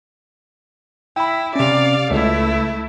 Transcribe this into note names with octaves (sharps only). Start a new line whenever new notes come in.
E4 G5 B5
C3 C#4 D5 F5
C#2 A3 E4